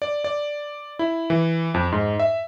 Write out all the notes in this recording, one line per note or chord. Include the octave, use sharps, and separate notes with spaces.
D5
D5
E4
E3
F2
G#2
E5